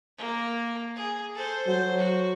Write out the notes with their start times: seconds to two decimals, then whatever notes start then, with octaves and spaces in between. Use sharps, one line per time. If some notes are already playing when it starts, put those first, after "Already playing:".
0.18 A#3
0.96 G#4
1.35 A4 C5
1.67 F#3 C5
1.97 F#4